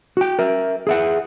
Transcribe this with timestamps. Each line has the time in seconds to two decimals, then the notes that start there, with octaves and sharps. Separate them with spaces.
0.17 F#4 G5
0.39 A#4 E5
0.87 G#4 E5 F#5